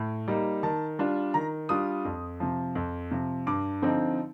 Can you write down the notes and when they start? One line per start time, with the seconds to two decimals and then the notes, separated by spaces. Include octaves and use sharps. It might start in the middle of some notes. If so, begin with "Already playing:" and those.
Already playing: A2
0.28 G3 A#3 D#4
0.63 D#3 A5
0.99 G3 D4 F4
1.34 D#3 A#5
1.69 G3 D4 F4 D#6
2.05 F2
2.40 C3 F3
2.75 F2
3.11 C3 F3
3.47 G2 D6
3.82 D3 F3 C4 D#4